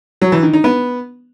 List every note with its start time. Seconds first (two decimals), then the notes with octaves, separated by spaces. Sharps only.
0.22 F#3
0.32 E3
0.43 D#3
0.53 D#4
0.64 B3